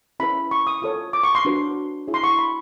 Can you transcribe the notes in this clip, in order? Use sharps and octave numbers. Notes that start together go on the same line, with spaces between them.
C#4 E4 G#4 B4 B5
C#6
D#6
F4 A4 C#5 D#6
D6
C#6
C6
D4 F#4 B4
E4 G#4 C#5
C6
C#6
B5